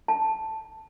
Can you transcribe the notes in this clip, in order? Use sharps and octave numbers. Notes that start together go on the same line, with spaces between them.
A5